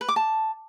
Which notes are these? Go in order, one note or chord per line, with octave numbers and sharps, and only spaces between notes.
B4
D6
A5